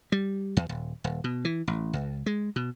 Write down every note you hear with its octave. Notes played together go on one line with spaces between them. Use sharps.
G3
E2
D#1
D#1
B2
E3
A1
C#2
G#3
B2